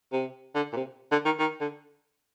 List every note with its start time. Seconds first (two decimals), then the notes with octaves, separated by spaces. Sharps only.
0.12 C3
0.55 D3
0.73 A#2
0.76 C3
1.12 D3
1.25 D#3
1.40 D#3
1.61 D3